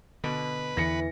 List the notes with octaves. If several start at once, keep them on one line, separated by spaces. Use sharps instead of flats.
B2 D3 B4
E2 D3 E3 A#6 C#7